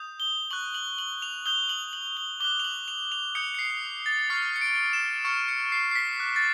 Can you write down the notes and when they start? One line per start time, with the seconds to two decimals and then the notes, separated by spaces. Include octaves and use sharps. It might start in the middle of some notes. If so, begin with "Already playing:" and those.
Already playing: D#6 G6
0.20 G7
0.51 C#6 F#6 F#7
0.75 F#7
0.99 F#7
1.22 F7
1.46 D#6 G6 G7
1.69 F#7
1.93 F#7
2.17 G7
2.40 D6 F#6 G7
2.60 F7
2.64 F#7
2.88 F7
3.12 F7
3.35 D#6 G6 C#7
3.54 C#7
3.59 C7
4.06 A6
4.30 C#6 F6 C7
4.56 C#7
4.61 D7
4.93 E7
5.25 C#6 F6 C#7
5.48 C#7
5.72 C7
5.91 C7
5.95 B6
6.19 D6 F#6
6.36 A6